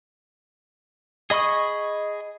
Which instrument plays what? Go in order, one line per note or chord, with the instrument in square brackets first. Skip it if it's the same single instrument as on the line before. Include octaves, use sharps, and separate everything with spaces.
[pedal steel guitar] G#4 D#5 B5 C#6 D#6